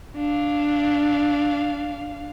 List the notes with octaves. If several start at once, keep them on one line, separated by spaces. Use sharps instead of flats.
D4 F5